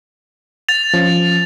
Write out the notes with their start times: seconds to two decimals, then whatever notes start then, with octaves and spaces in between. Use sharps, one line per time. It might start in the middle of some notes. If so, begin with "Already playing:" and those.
0.69 A6 F7
0.94 F3 C#4